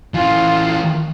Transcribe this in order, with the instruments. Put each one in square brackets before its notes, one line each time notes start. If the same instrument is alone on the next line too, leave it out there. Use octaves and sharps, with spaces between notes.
[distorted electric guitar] E3 C#4 [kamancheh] F4